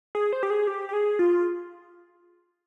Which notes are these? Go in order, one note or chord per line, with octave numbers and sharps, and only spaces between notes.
G#4
C5
G4
G#4
G4
G4
G#4
F4